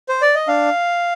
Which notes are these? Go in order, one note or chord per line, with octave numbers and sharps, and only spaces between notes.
C5
D5
D#5
D4 F5